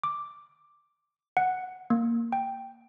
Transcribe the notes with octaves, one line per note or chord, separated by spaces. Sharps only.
D6
F#5
A#3
G5